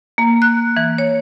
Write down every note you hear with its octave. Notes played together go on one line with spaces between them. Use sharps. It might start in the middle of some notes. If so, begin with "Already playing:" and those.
A#3
F#6
E3
C#5